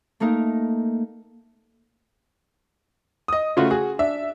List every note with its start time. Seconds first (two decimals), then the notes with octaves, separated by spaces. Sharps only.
0.20 A3 A#3 D#4 A#4
3.28 D#5 D#6
3.57 C#3 A3 F4 F#4
3.70 F#4 G#4
3.99 D4 E5